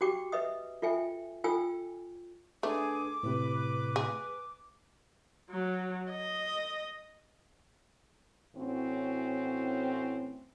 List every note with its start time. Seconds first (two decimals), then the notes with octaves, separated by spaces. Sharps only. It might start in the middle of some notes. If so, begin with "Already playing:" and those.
0.01 F#4 G4 G5 D6
0.32 B4 D#5 E5 D#6
0.82 F4 A4 E5 G5 G#5
1.44 F4 A4 G5 G#5 E6
2.63 A3 D4 G#4 B4 D6
3.23 A2 C3 B4
3.96 G#4
5.50 F#3
6.10 D#5
8.56 A2 E3 C4 C#4 F#4